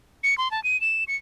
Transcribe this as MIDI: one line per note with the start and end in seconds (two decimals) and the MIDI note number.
0.24 0.37 97
0.38 0.51 84
0.51 0.63 81
0.64 0.80 99
0.81 1.04 100
1.08 1.16 97